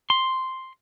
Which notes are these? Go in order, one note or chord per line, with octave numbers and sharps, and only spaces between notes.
C6